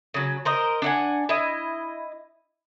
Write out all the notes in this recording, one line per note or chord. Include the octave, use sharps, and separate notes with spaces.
C#3 F#3
A#4 C5 D#5
D4 F#5 G#5
E4 D#5